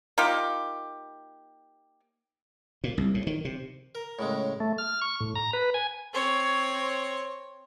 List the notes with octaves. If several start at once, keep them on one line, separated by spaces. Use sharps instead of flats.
A#3 D#4 F4 G4
A#2
C2
A2
D#3
C3
A#4
A2 C#3 G#3
A3
F6
C#6
A2
A#5
B4
G#5
C4 C#5